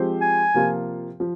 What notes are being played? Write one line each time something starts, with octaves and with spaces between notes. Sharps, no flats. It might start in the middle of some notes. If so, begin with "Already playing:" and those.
Already playing: F3 G#3 C4 G4 C5
G#5
C3 F3 A#3 F4
F3